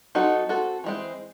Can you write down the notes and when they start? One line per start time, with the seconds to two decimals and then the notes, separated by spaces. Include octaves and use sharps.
0.15 F#3 C4 D#4 F#4 A4
0.49 C4 F#4 A4
0.84 E3 G#3 C4